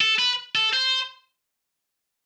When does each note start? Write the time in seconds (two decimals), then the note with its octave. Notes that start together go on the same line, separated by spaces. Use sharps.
0.01 A4
0.19 B4
0.55 A4
0.73 C5